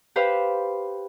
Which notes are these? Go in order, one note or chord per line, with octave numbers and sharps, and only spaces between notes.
G4 B4 C5 F5 G5